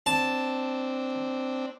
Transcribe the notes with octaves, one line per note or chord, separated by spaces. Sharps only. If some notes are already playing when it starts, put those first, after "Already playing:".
C4 D4 A5